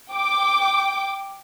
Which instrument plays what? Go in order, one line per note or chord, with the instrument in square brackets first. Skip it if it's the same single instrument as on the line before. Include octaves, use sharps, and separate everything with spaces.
[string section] G5 D6